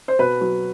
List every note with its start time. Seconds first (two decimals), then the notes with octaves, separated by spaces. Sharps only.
0.08 C5
0.19 B2 B4
0.41 F#3